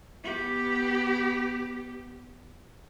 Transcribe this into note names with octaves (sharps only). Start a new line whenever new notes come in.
B3 G4